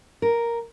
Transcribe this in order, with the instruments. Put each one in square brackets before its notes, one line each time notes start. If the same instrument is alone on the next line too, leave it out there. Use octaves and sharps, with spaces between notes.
[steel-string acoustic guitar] A#4